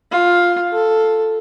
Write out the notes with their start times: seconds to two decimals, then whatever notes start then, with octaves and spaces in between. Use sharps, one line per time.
0.11 F4
0.72 A4